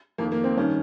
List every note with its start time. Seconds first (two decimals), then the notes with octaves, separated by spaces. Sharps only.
0.18 F2 D#3 A#3
0.32 A#3
0.44 C4
0.57 G2 D#3 C#4